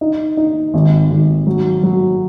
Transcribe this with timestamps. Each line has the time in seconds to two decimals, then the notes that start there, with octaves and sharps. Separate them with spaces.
0.01 D#4
0.37 D#4
0.74 G#1
1.10 G#1
1.47 F#3
1.83 F#3